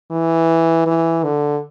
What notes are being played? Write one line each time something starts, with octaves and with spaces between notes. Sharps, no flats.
E3
E3
D3